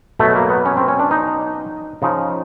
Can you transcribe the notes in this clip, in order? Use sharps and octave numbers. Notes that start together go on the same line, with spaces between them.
B2 F#3 A3
A#3
B3
C#4
C4
C#4
D4
D#4
C#3 F3 D#4